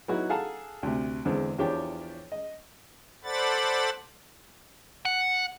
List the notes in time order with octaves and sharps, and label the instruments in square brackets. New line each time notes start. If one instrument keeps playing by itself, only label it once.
[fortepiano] F#3 B3 D#4 E4 F#4
G#4 A4 F5 F#5 A5 A#5
D2 C3
E2 D3 G#3 C4
E2 F3 D4 G4 C#5 G5
D#5
[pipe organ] A4 C5 D5 F#5 B5 A6
[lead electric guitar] F#5